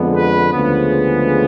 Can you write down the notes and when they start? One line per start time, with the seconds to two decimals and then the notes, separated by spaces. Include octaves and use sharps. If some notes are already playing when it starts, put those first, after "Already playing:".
Already playing: F2 D3 G#3 B3
0.16 B4
0.54 D2 C#3 F3 G#3 B3